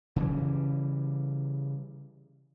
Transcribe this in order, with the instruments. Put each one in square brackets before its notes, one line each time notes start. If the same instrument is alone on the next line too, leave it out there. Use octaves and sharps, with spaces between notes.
[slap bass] C#3 E3 G3